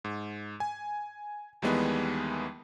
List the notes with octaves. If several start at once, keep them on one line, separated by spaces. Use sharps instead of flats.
G#2
G#5
D#2 D#3 E3 G3 G#3 B3